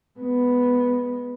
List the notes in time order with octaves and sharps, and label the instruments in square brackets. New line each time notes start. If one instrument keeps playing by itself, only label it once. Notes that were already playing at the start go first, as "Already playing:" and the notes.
[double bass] G#3 B3